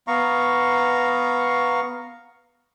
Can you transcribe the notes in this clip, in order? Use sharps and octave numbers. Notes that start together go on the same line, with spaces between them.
B3 F5 A#5 C#6